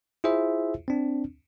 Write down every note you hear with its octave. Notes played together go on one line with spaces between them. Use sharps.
E4 F4 G#4 C5 E5
C4 D4